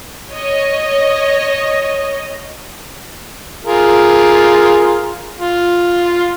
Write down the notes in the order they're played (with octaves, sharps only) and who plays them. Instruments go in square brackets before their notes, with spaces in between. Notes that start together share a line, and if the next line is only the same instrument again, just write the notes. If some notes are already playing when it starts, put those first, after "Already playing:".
[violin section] C#5 D#5
[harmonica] F4 G#4 A#4
F4